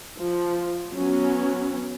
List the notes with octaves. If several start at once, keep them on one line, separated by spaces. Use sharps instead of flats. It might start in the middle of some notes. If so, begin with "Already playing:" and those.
F3
F#3 B3 C#4